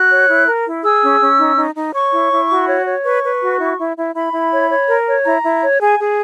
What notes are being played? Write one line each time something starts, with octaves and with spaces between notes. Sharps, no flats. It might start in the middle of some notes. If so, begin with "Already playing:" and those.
Already playing: F#4 F#6
C#5
E4
A#4
E4
G#4 E6
C#4
C#4
D#4
D#4
D#4
C#5 C#6
E4
E4
F#4
C#5
C#5
B4 C#6
B4
F#4
E4
E4
E4
E4 B5
E4
C#5
C#5
A#4
C#5
E4 A#5
E4
C#5
G#4 G#5
G#4